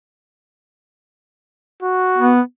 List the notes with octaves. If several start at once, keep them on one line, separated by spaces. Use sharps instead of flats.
F#4
B3